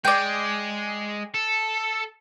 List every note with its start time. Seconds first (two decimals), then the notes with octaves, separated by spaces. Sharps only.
0.05 G#3 D5 G5
1.34 A4